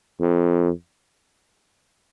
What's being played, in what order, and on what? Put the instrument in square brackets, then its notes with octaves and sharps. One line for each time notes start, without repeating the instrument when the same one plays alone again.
[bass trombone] F2